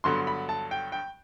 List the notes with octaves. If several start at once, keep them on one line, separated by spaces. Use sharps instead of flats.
G2 D3 F#3 B3 C6
B5
A5
G5
G5